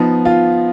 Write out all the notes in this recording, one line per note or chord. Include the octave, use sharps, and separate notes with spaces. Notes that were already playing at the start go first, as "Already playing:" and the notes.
Already playing: F3 B3 D#4
F4 F5